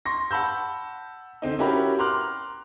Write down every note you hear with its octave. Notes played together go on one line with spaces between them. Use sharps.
C6 C#6 A#6
F#5 A5 B5 E6 G6
D3 C4 D#4
C#4 E4 F#4 G4 A#4 B5
A#5 C6 D6 F6 F#6